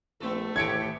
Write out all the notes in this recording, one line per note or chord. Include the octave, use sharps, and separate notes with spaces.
A#1 A3 B3 A4
A2 D#3 E3 G4 G#6 C#7 D7